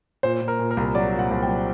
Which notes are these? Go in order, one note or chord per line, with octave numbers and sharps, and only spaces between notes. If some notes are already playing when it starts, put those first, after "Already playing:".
A#2 C5
A#2
A#4
A#2
A#4
C2
F#3 D5
A#2
F#5
C2
G5
F#3